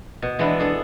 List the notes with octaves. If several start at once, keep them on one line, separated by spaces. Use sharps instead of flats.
B2
E3 G#3 B3 D4 E4
D4 G#4 A4